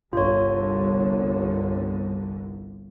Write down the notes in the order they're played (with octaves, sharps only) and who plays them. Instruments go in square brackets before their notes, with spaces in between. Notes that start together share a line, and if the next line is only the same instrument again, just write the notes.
[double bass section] G1 C2 D3 [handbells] F4 C#5